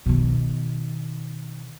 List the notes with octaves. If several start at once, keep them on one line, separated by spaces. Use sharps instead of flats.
B2 D#3